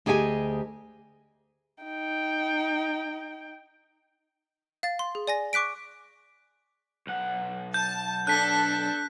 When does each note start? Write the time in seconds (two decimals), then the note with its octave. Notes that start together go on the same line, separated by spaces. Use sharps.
0.06 D2 G4 G#4 D#5 G5 G#5
1.84 D#4 G5
4.83 F5 A6
4.99 C6
5.15 G#4
5.27 D5 G#5 A#6
5.53 C#6 D6 F#6 B6 D7
7.07 B1 F#5
7.74 A5 G6
8.27 D4 A4 F#6 B6